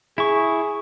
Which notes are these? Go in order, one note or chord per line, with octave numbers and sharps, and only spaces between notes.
E4 G#4 C#6